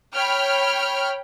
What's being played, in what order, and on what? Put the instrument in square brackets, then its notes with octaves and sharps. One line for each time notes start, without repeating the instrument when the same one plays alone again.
[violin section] C#5 G5 B5 F6